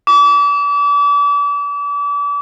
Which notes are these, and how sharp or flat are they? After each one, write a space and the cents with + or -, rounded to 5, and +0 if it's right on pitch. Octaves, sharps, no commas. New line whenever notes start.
D6 -35